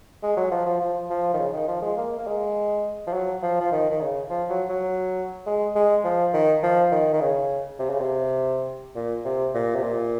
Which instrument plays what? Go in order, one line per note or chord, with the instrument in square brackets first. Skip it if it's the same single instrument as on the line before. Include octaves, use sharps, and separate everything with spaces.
[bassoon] G#3
F#3
F3
F3
F3
F3
D#3
C#3
D#3
F3
G#3
A#3
A#3
G#3
F3
F#3
F3
F3
D#3
D#3
C#3
F3
F#3
F#3
G#3
G#3
F3
D#3
F3
D#3
D#3
C#3
C3
C#3
C3
A#2
C3
A#2
C3
A#2